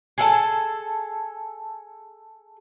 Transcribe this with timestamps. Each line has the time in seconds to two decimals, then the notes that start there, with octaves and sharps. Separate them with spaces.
0.18 G#4 A4 F#5 A5